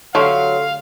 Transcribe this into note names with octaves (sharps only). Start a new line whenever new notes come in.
D3 F#3 A3 G4 F5 C6